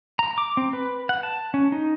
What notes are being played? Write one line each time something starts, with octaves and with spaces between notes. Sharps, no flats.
A#5
D6
C4
B4
F#5
A5
C#4
D#4